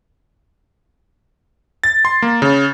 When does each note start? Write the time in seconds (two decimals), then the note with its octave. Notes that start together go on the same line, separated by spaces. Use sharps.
1.84 A6
2.05 C6
2.22 A#3
2.42 C#3